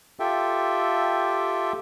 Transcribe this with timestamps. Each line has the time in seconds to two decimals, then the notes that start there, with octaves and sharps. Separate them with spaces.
0.20 F4 G4 A4 E5 G5